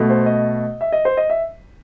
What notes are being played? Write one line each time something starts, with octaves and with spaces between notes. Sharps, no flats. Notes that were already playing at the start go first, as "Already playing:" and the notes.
Already playing: B2 A3
C5
D#5
E5
D#5
C5
D#5
E5